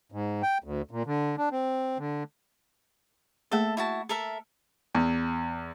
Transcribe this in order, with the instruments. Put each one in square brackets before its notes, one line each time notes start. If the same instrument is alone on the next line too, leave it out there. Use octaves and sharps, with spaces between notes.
[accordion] G#2
G5
D2
A#2
D3
D4
C4
D3
[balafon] A3 A#3 G#4 [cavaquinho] A4 E5
[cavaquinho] E4 F#4 A5
A4 A#4 E5
[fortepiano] E2